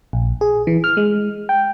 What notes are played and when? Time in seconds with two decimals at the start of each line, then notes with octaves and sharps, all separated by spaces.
0.13 A#1
0.41 G#4
0.67 E3
0.84 F6
0.97 G#3
1.49 G5